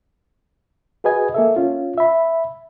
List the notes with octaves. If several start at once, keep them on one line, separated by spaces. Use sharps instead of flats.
F#4 G#4 B4 D#5 G#5
A#3 A4 E5
C#4 F4
E5 B5